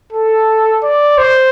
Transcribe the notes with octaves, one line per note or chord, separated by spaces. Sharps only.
A4
D5
C5